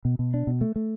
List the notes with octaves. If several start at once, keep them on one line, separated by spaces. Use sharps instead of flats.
B2
B2
D4
B2
A3
A3